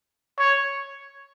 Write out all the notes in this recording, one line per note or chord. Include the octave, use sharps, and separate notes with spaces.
C#5